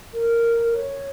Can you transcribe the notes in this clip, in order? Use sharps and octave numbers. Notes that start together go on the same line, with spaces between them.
A#4
C#5